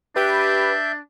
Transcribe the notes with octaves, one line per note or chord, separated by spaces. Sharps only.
D4 G4 B4 E5 G6